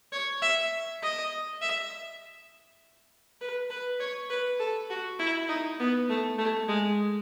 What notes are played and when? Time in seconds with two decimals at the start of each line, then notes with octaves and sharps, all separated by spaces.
0.12 C#5
0.42 E5
1.02 D#5
1.61 E5
3.41 B4
3.70 B4
4.00 C#5
4.30 B4
4.60 A4
4.90 F#4
5.19 E4
5.49 D#4
5.80 B3
6.09 A3
6.38 A3
6.68 G#3